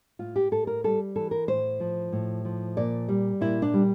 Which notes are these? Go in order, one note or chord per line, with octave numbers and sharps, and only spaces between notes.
A2 F4
G4
A2 A4
A#4
G3 A4
E3 A4
A#4
A2 C5
F3
A2
F3
A#2 D5
G3
A#2 E4
D4
G3